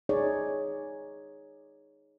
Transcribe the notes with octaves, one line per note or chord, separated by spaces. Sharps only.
D#4 G#4 C#5 D5